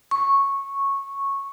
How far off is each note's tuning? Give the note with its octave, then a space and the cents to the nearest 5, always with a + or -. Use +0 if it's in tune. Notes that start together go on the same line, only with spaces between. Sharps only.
C#6 -10